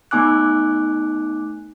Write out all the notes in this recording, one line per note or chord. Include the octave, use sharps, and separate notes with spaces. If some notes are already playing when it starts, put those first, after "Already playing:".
A3 B3 D#4 G#5 D6 F#6